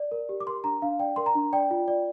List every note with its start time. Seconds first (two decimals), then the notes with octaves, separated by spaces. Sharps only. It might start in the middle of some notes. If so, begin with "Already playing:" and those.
Already playing: D5
0.11 A#4
0.29 G4
0.40 D6
0.47 A#4 C6
0.64 D4 A#5
0.82 D4 F5
1.00 D5 G5
1.16 A#4 C6
1.26 A#5
1.35 D4
1.53 D5 G5
1.71 F4
1.88 D5